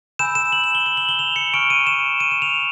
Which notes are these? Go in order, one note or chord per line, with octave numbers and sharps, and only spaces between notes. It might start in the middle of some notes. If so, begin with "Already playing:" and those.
G#5 B5 E6 G6 E7
E7
F#7
F#7
G7
F#7
F#7
G7
F7
C#7
G#5 C#6 F6 D7
D#7
E7
D#7
E7
F7